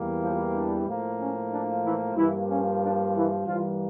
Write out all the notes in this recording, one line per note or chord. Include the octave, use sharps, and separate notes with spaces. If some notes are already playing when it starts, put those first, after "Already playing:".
Already playing: E2 E3 G3 A#3
F3 F4
D4
A2 F3 A#3
C#4
D4
E3 E4
G2 E3 F3 A#3 E4
C#4
D4
E3 E4
G2 E3 F3 G3 A#3 F4